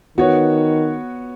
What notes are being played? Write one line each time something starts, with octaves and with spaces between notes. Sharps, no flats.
D#3 B3 F#4 C#5